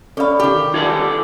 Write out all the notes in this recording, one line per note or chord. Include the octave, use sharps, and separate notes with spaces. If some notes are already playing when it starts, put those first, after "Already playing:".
C#4 A4 D5 F5 B5
D#3 G4
F4 A4 D5 G#6